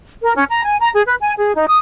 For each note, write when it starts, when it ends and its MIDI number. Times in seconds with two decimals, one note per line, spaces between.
0.21 0.33 70
0.36 0.44 61
0.50 0.62 82
0.64 0.76 80
0.79 0.88 82
0.94 1.02 68
1.06 1.15 71
1.20 1.33 80
1.37 1.54 68
1.54 1.65 63
1.67 1.79 87